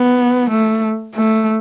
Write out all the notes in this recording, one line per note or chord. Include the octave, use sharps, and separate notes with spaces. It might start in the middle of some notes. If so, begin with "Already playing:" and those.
Already playing: B3
A3
A3